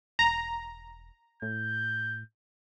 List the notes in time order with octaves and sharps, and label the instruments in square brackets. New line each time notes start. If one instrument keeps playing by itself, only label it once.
[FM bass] E1 [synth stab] A#5
[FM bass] A2 [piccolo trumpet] G6